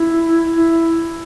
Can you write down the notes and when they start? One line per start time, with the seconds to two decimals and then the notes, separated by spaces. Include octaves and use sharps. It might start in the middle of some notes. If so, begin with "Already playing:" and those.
Already playing: E4
0.55 E4